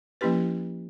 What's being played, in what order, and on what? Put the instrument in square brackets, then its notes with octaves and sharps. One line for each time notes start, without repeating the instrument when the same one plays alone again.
[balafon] F3 A#3 C#4 E4 G4 B4